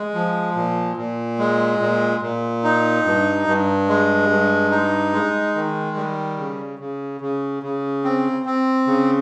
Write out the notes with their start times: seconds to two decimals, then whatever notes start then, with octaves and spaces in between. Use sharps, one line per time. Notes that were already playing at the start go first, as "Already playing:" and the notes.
Already playing: G#3
0.14 F3
0.56 A#2
0.97 A#2
1.39 G#3
1.81 A#2
2.22 A#2
2.64 D#4
3.06 G2
3.47 G2
3.88 G#3
4.29 G2
4.71 D#4
5.13 G#3
5.55 D#3
5.97 G3
6.38 C#3
6.79 C#3
7.21 C#3
7.63 C#3
8.04 C4
8.46 C4
8.87 C#3